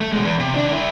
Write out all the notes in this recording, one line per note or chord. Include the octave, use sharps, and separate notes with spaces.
A3
B2 G#3
E2
C3
D#3 D4
E4 A#4